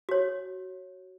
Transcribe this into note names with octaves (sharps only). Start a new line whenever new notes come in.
F#4 C#5